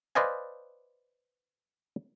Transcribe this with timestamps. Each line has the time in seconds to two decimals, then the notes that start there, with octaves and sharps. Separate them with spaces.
0.15 B4 C5 D5 D#5 F5 G#5